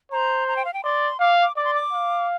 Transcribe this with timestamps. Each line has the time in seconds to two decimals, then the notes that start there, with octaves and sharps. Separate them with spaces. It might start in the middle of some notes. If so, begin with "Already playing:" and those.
0.12 C5 A#5
0.48 A#5
0.56 G5
0.65 F5
0.74 G5
0.84 D5 C6
1.20 F5 D6
1.42 D6
1.56 D5 D6
1.65 C6
1.74 D6
1.92 F5